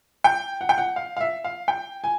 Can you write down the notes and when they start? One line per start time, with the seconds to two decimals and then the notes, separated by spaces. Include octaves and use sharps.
0.24 G5
0.61 F#5
0.69 G5
0.78 F#5
0.96 F5
1.17 F5
1.21 E5
1.44 F5
1.68 G5
2.04 G#5